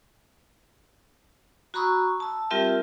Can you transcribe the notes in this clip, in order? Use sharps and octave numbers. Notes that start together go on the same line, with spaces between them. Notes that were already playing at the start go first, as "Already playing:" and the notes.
F#4 A#5 B5 C#6 D#6 E6
A5 E6
G3 C4 F4 G4 A#4 E5